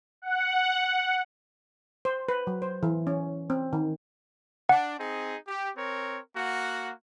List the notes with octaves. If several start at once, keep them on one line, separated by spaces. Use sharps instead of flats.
F#5
C5
B4
F#3
C5
E3
C#4
C4
D#3
D4 F#5
C4 D#4 G#4
G4
C4 A#4 C#5
A#3 F#4 F#5